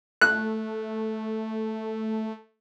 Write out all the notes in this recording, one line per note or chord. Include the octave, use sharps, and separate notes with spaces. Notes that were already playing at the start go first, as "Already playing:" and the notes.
A3 F#6